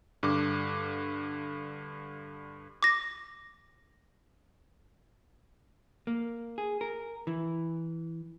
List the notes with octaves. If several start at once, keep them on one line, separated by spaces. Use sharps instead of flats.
G2 D3 D6
D6 A#6
A#3
G#4
A#4
E3